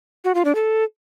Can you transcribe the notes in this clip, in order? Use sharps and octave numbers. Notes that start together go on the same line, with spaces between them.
F#4
F4
D4
A4